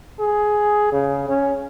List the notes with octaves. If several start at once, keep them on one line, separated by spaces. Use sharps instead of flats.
G#4
C#3
C#4